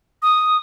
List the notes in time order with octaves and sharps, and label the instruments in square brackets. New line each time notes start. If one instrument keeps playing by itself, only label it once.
[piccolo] D#6